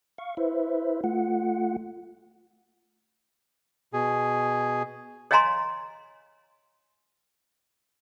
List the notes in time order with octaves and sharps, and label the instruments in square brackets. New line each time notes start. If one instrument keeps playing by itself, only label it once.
[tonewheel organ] F5 C#6
E4 B4 C5 E5
A3 F4 F#5
[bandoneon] B2 G#4
[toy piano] C#5 D#5 F5 G#5 A#5 C6